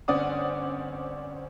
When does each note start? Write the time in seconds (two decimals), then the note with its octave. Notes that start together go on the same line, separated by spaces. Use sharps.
0.08 G1 C4 C#4 D5 F#5 D#6